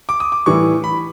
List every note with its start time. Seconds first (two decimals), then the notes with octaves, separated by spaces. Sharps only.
0.09 D6
0.20 D#6
0.32 D6
0.46 A2 E3 G3 C#6
0.84 B5